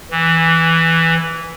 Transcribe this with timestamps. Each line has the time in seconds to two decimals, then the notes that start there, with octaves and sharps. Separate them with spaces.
0.11 E3